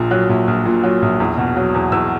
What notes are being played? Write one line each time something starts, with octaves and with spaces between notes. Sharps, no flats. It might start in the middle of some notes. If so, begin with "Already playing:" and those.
Already playing: A#1 A#2
F#3 F#6
A#1
A#1
A#2
F#3
A#1
E2
B2
F#3
E2
E2 E6